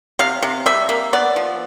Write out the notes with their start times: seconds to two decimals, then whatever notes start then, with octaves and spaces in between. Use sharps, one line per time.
0.19 C3 F5
0.43 C3
0.66 G3 E5
0.89 A#3
1.13 B3 D5
1.36 F3